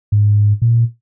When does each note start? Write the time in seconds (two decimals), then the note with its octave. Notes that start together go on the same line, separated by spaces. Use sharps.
0.12 G#2
0.62 A#2